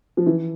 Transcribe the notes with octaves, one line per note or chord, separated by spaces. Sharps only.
F3
E3